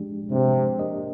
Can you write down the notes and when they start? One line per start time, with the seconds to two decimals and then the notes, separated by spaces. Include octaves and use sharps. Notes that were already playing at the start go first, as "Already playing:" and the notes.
Already playing: F3 G#3 D4 G4
0.31 C3 F3 G#3 D4 G4
0.79 A#3 D4 G4 A#4 D#5